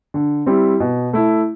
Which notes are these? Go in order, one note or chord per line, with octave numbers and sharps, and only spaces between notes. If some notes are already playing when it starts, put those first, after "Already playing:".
D3
G3 C4 E4
B2
A3 E4